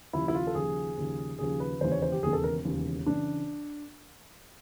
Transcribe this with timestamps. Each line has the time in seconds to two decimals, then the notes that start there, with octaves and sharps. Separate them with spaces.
0.13 D#2 C#3 F3 E4
0.28 E4
0.35 F4
0.47 A4
0.55 D#2 C#3 F3 G#4
0.97 D#2 C#3 F3
1.39 D#2 C#3 F3 G#4
1.60 B4
1.81 E1 D#2 C#3 E3 C5
1.92 C#5
2.02 C5
2.12 G4
2.23 E1 D#2 C#3 E3 G#4
2.33 A4
2.44 A#4
2.65 E1 D#2 C#3 E3
3.06 C#3 E3 D4